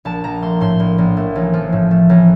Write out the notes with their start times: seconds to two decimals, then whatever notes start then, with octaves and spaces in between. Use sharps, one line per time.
0.05 A#1 A5
0.24 A#1 A#5
0.42 A3 C6
0.61 A2 C6
0.80 A#1
0.98 A#1
1.17 A3
1.36 A1
1.54 F3
1.72 A2
1.91 A3
2.10 A1